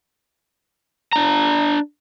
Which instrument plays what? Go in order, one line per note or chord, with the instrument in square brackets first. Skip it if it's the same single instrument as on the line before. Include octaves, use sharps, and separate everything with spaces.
[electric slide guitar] D4 A#5